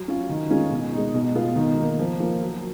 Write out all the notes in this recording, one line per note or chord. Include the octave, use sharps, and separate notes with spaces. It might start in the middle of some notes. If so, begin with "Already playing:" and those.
Already playing: F#3
C#4 F4
D#3
G#3 C#4 F4
B2
D#4
G#3
B2
G#3 B3 F4
D#3
A#3 D#4
F3
A#3 F4
F#3